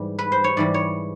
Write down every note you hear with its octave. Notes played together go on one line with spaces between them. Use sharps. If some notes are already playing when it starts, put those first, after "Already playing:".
Already playing: G#2 E3 G3
B4
C5
C#5
G#2 E3 G3 D5
C#5